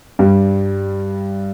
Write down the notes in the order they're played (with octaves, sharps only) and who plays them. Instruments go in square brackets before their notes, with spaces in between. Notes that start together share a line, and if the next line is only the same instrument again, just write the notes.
[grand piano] G2 G3